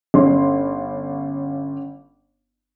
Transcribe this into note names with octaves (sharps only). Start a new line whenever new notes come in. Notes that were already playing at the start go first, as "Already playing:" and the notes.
G1 C#4 C6